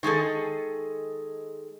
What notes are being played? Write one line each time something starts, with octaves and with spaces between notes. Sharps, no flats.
D#3 G#3 G#4 A4